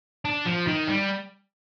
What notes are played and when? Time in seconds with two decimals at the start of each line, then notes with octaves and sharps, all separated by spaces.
0.25 D4
0.46 F3
0.67 D#3
0.87 G3